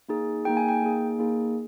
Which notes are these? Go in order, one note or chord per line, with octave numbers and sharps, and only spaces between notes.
A#3 D#4 G#4
A#3 D#4 G#4 G5
G#5
G5
A#3 D#4 G#4
A#3 D#4 G#4